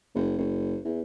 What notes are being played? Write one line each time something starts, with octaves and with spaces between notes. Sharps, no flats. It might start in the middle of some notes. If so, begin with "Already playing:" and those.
F#1
F#1
E2